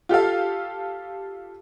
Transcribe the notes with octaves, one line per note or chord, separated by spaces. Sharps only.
F4 G4 A4 F5